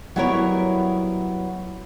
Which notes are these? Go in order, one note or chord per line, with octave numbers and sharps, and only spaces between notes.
F#3 G3 B3 E4 A#4 C#5